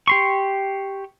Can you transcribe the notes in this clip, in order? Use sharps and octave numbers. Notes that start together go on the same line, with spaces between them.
G4 C6 C#6